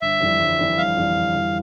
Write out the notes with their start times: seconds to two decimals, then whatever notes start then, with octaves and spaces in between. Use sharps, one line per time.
0.02 G1 E5
0.21 F2 E3 G3
0.40 G1
0.59 F2 E3 G3
0.78 G1 F5
0.97 F2 E3 G3
1.16 G1
1.35 F2 E3 G3